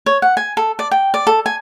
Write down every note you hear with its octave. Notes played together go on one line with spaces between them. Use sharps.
C#5
F#5
G#5
A4
D5
G5
D5
A4
G#5